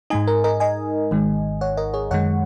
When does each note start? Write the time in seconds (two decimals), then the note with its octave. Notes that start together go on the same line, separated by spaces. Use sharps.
0.10 G#2 G#3 D#4 D#5 G#5
0.27 A#4
0.44 A#4 D#5
0.60 D#5 G#5
1.11 G#1 G#2 D#3 G#3
1.61 C#5 F#5
1.77 A#4 D#5
1.94 G#4 C#5
2.11 F#2 D#3 G#3 C#5 F#5